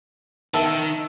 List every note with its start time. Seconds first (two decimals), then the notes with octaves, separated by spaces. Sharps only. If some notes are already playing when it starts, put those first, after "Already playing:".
0.54 D#3 A#4 E5 A5